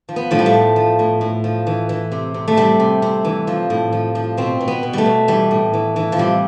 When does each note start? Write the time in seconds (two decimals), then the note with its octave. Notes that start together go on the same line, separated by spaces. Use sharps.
0.09 F3
0.16 B3
0.31 A2 F3
0.39 G3
0.46 A3
0.54 F3
0.76 F3
0.99 A2
1.21 A2
1.44 F3
1.67 E3
1.89 E3
2.12 C3
2.34 C3
2.48 A3
2.57 C3 G3
2.80 C3
3.02 C3
3.25 E3
3.47 F3
3.70 A2
3.92 F3
4.15 F3
4.37 B2 C4
4.61 B2
4.68 B3
4.83 B2
4.93 G3 A3
5.06 B2
5.28 E3 G3
5.51 A2
5.74 E3
5.96 E3
6.12 F3
6.18 C3 G3